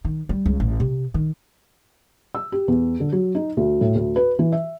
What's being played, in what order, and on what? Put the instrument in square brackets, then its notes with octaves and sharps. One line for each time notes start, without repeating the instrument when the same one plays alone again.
[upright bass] D#3
G3
C#2
A1
C3
D#3
[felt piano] E6
G4
E2
D3
F#3
D#4
D2
A2
D2
B4
E3
E5